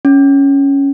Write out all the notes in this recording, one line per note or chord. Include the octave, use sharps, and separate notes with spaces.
C#4